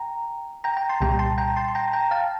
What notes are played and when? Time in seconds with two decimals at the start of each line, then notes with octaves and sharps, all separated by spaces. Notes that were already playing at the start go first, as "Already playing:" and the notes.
Already playing: G5 A#5
0.64 G5 A#5
0.77 G5 A#5
0.89 A5 C6
1.01 C2 A#2 G3 G5 A#5
1.19 A5 C6
1.38 G5 A#5
1.56 A5 C6
1.68 C6
1.75 G5 A#5
1.93 G5 A#5
2.11 F5 A5